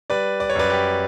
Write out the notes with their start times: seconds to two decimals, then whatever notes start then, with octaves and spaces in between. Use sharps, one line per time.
0.10 G3 B4 D5
0.40 D5
0.50 C#5
0.55 F#2 B4 D5
0.70 G4 B4